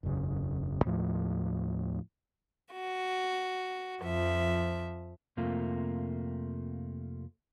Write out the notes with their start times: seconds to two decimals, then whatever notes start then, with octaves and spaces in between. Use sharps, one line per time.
0.03 E1 B1 F#2 C#3
0.85 D#2 A2 F3 A3
2.72 F#4
4.03 F2 F3 E5
5.37 F2 C3 A3 A#3 F4